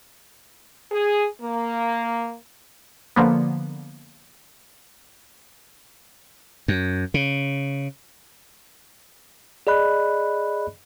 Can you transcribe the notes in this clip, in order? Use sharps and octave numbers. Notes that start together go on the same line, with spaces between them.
G#4
A#3
D3 F3 A#3 B3
F#2
C#3
G#4 D5 D#5 B5 F#6